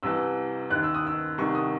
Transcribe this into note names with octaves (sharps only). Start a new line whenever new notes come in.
C2 C3 E3 E6
D#2 D#3 F#6
E6
D#6
E6
C2 C3 D#3 C#6
D#6